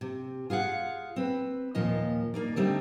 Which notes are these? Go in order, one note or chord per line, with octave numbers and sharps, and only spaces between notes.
C3
F4 G#4 F5 F#5
C4 B4
D#2 A#2 F3 D#5
A#3 D#4 D5
D3 G3 A3 C4 D#4